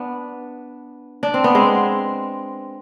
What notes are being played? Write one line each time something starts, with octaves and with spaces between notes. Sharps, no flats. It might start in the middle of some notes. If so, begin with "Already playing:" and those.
Already playing: B3 D4
D4
C4
B3
G#3 C4